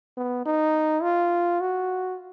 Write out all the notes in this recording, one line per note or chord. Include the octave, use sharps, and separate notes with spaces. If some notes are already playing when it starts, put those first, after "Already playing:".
B3
D#4
F4
F#4